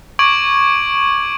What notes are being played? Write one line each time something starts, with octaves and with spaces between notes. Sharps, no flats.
C#6 D6 G#6 D7 F#7